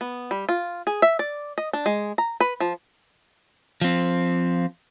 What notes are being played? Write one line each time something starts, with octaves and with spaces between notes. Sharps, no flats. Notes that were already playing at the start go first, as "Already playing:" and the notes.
B3
G3
F4
G#4
E5
D5
D#5
D4
G#3
A#5
B4
F3
F3 C4